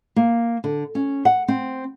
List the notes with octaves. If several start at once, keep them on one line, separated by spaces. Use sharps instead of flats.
A#3
D3
C#4
F#5
C4